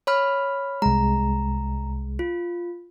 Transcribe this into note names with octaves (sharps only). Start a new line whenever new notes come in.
C#5 B5 F6
C2 G#3 A#5
F4